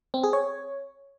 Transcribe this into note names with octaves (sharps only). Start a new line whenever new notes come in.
C4
G#4
C#5